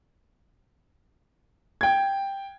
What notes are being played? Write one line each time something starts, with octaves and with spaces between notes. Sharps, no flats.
G5 G#6